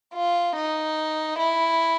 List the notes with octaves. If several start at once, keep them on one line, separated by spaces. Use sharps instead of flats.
F4
D#4
E4